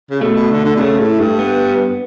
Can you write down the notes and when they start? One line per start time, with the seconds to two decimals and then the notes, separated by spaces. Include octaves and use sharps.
0.11 C#3
0.21 B2 A3
0.36 B2
0.51 D3
0.65 D3
0.76 B2
0.80 C#3 A3
1.00 A2
1.20 G2
1.39 B3